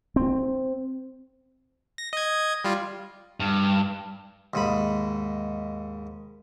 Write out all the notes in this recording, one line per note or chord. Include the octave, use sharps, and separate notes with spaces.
C4
A#6
D#5 G#6
G3 F4
G2
D#2 G#2 B5